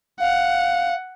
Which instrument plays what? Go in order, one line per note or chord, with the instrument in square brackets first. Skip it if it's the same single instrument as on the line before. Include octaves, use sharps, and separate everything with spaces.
[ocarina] F5 [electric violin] F#5